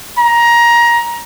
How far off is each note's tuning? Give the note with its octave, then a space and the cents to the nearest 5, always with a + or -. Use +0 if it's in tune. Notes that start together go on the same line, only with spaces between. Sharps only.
A#5 +20